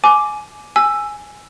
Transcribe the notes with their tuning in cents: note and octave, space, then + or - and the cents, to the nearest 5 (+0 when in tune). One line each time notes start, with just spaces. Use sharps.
G#5 +20 D6 +0
G#5 +0 E6 +10